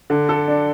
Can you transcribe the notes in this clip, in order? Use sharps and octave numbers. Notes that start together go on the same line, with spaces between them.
D3
A4
D4